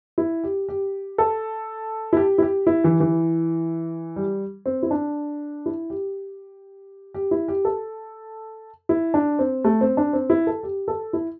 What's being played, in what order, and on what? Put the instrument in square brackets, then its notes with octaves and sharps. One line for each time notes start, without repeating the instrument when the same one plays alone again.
[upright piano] E4
G4
G4
A4
E4
G4
E4
G4
E4
E3
E3
G3
C4
E4
D4
E4
G4
G4
E4
G4
A4
E4
D4
C4
A3
C4
D4
C4
E4
A4
G4
A4
E4